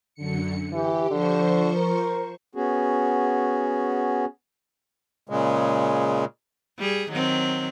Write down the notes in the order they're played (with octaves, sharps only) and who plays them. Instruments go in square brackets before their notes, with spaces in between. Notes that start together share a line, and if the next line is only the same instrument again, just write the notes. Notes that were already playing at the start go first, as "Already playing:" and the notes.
[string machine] F#2 D3 C#7
[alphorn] E3 [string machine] G4
[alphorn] D3 [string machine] F3 C5 C#6
[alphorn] A#4
[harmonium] B3 C#4 F#4 G#4
[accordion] A#2 C#3 G#3
[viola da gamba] G3 G#4
D#3 F#3 C4